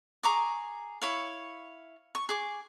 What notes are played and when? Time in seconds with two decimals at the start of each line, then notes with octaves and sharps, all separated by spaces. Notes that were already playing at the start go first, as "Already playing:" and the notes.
0.23 G#4 A#5 C#6 D6
1.02 E4 C#5 F5
2.15 C#6
2.29 G#4 D6